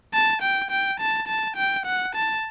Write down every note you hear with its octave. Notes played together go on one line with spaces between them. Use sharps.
A5
G5
G5
A5
A5
G5
F#5
A5